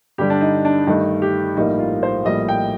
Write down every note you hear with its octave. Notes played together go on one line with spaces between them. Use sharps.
G2 D3 G3 G4
D4
D#4
D4
G2 D#3 A3 D#4
G4
A#1 A2 G3 A#3 D#4
F4
C5
A#1 A2 G3 A#3 D#5
G5